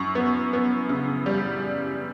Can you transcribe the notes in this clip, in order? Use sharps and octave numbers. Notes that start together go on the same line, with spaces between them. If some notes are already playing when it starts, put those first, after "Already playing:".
Already playing: F#2 C#6
B3
B3
C#3
G3